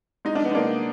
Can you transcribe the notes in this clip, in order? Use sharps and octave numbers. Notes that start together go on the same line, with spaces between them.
G#3 D#4
D4
B3
G#3 A#3 D4